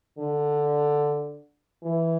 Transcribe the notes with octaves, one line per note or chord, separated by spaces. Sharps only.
D3
E3